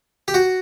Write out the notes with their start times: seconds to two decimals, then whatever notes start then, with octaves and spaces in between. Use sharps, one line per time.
0.28 G4
0.34 F#4